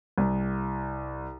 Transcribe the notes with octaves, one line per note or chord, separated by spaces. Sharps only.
C2